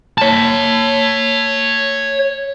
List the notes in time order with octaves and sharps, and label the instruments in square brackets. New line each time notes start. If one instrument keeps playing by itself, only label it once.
[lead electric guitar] C#5 A5